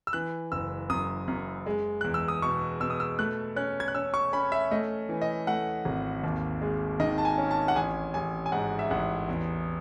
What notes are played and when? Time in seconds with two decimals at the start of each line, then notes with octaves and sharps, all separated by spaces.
0.07 E6
0.13 E3 F#6
0.52 F#1 E6
0.90 F#2 D#6
1.28 F#2
1.66 G#3
2.01 E2 F#6
2.14 E6
2.28 D#6
2.42 B2 C#6
2.80 B2 E6
2.90 D#6
3.00 E6
3.19 A3 F#6
3.56 C#4 F#6
3.80 G#6
3.88 F#6
3.95 C#4 E6
4.14 C#6
4.33 C#4 B5
4.52 E5
4.71 A3 D#5
5.09 E3
5.22 D#5
5.47 A3 F#5
5.85 G#1
6.24 D#2
6.61 G#3
7.00 D#3 D#5
7.18 A5
7.25 G#5
7.38 C#4
7.51 A5
7.68 F#5
7.76 A1 G#5
8.14 A1 G#5
8.46 G#5
8.52 G#2 F#5
8.79 E5
8.90 A1 F#5
9.29 E2